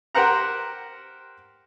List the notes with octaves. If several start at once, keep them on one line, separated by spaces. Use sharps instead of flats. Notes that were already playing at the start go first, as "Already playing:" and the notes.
G4 A#4 C5 F#5 A#5